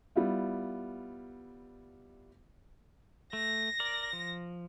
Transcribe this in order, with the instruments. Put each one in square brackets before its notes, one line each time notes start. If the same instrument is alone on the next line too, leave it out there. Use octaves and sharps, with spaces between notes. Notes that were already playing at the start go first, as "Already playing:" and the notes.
[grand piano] G3 B3 E4 F4
[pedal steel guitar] A3 [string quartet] A#6
[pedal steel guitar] A#4 D5
F3